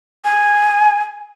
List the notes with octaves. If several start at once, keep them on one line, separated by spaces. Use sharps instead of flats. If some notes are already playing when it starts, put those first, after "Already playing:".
G#5